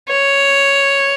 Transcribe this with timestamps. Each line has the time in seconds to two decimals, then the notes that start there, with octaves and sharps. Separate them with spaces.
0.09 C#5